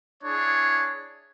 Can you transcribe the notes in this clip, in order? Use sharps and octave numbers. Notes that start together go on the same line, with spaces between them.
D4 E4 G#4 C#5